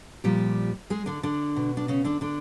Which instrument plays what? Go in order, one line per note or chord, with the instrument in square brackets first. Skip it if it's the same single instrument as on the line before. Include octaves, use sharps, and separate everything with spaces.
[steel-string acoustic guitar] A#2 F3 G3 G4
G#3 G#4
D3 D4
D3 D4
B2
D4
C#3 C#4
D3 D4
D3 D4